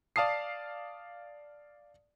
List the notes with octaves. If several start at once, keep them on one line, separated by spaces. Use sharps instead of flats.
D5 F5 A5 D#6 C7